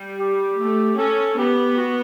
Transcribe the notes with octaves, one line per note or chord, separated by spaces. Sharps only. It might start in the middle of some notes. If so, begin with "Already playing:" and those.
Already playing: G3
G4
A3
C#4 A4
B3 G4
F#4